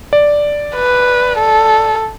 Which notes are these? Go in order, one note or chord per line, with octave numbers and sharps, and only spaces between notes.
D5
B4
A4